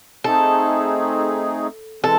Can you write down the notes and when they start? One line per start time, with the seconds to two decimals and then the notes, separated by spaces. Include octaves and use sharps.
0.24 A3 C4 D#4 G#4 A4
2.03 E3 G#3 C4 A4